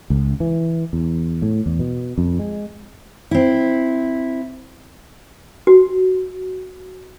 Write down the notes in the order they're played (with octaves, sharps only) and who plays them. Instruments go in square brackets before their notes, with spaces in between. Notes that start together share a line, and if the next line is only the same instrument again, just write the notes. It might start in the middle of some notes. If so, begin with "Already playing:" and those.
[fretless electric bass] C#2
E3
E2
A2
E2
B2
F2
G#3
[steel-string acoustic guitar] C4 E4
[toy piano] F#4